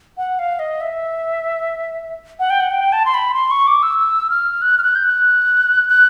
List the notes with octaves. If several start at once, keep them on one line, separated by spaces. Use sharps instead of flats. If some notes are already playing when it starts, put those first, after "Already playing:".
F#5
F5
D#5
E5
F#5
G5
F#5
G5
A5
C6
B5
C6
C#6
D6
E6
E6
F6
F#6
F6
F#6
G6
F#6
F#6